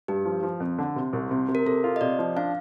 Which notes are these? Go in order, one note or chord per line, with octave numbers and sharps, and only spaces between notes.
G2 G4
F3
F3
F2
D3
C3
C2
C3
C3
A#4
C3 A4
F4
D#5
C3 D5
F3
D4 F5